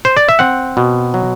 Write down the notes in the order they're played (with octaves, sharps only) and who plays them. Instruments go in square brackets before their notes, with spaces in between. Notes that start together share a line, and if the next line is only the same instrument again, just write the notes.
[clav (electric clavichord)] C5
D5
E5
C4 F#5
B2
F#3